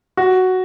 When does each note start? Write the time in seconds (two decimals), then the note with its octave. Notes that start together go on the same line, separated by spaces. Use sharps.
0.17 F#4